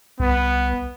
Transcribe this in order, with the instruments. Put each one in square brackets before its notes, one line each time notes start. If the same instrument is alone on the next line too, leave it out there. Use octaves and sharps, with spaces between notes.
[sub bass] C2 [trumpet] B3